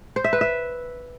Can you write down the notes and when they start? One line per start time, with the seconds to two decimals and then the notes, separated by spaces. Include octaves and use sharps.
0.16 C5
0.24 E5
0.33 B4
0.41 E5